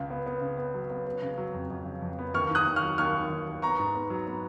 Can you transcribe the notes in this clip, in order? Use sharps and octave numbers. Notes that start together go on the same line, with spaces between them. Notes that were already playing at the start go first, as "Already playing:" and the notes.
Already playing: C#2 C#3
B3
B3
C#3
B3
F#3
B3
B3
C#3
F#3
F2
F2
C#3
F2
B3
D#2 C#6 F6
D#3 D#6 F#6
D#2
C#6 F6
F#3
D#2 C#6 F6
D#2
D#2
D#2
B3 A#5 C#6
G#2
B3
F#3
B3